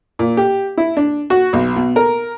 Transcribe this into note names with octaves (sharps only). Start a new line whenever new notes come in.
A#2
G4
E4
D4
F#4
B1
B2
A#4